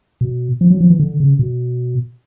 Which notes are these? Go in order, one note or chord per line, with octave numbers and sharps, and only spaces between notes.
B2
F3
F#3
F3
E3
D3
C#3
B2